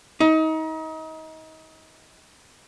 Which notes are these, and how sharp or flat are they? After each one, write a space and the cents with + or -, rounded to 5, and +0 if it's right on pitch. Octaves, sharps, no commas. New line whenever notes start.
D#4 +30